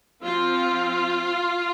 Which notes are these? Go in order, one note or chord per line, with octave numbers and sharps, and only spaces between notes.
F3 C4 F4